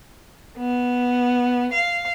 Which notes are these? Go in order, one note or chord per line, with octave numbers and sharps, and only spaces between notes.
B3
F5